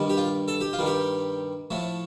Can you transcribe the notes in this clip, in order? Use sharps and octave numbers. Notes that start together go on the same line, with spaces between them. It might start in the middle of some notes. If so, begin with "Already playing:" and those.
Already playing: G2 D#3 G3
G4
F4
A4
G4
F4
G2 D#3 G3
G4
A2 F3 A3